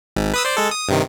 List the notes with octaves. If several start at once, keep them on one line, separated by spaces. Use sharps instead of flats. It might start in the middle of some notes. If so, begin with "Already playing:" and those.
G#1 G#2
B4 D#6 E6
C5 D5
G#3 A4
D#6
G2 C3 D#3